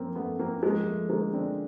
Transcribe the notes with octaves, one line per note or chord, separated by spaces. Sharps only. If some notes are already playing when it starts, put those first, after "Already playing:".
Already playing: F#2 F3 A#3 C4
F#2 A3 B3
F#2 A#3 C4
F3 G#3 A#3
F3 A3
D3 G#3 A#3
D3 C4 D4